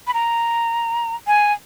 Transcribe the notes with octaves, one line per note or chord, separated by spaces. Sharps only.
B5
A#5
G#5